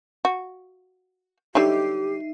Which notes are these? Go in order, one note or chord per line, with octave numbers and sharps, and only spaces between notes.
F#4
D3 F#3 G3 D#4 G4 E5 C7